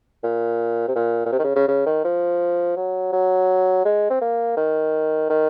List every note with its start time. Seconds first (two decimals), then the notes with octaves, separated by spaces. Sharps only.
0.23 A#2
0.88 C3
0.95 A#2
1.26 A#2
1.32 C3
1.39 D#3
1.44 C#3
1.56 C#3
1.68 C#3
1.86 D#3
2.04 F3
2.77 F#3
3.13 F#3
3.85 G#3
4.10 C4
4.21 A#3
4.57 D#3
5.30 D#3